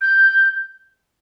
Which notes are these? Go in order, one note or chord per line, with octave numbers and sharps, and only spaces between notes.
G6